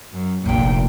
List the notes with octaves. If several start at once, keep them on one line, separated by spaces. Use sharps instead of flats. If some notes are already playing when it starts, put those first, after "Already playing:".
F#2
F1 A#1 A#2 G5